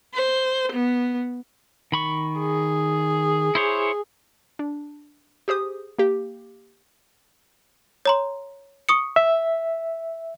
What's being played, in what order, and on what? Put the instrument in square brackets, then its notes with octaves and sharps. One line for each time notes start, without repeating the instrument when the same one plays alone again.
[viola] C5
B3
[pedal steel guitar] D#3 B5 C#6
[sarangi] G#4
[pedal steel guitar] E4 C5 C#5
[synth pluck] D4
G4 G#4 C5 D#6
A#3 G4
[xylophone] C#5 A#5 C6
C#6 D#6 C#7
[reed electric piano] E5